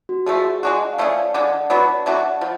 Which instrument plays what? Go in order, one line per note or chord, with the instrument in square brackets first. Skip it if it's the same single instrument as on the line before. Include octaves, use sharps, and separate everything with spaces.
[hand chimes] F#4
[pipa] D3 F3 A3 [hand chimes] G#4
[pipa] G#3 D4 F#4
[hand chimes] F5
[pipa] F3 A3 C#4 G#4 [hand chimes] D5
[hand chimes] D5
[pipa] D3 G#3 D4 [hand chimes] F#5
[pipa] F#3 B3 D4 F#4
[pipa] F#3 A3 D4 F#4 [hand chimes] F#5
[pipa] F3